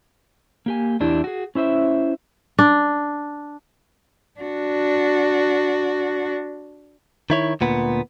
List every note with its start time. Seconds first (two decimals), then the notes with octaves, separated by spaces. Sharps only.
0.66 A#3 G4 G#5
1.00 E2 D4 E4 G4
1.24 F#4 G#4
1.55 C#4 E4 C5 E5
2.59 D4
4.40 D4 F#4
7.30 D#3 E4 C#5
7.61 D2 A#2 B3